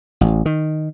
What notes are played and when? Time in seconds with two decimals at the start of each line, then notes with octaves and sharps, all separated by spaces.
0.21 A1
0.46 D#3